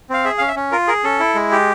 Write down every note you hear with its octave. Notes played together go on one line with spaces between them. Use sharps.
C4 F5
G#4 E5
C#4 F5
E5
C#4
F4 A#4
G#4 A#4
C#4 A4
E4
G#3
G4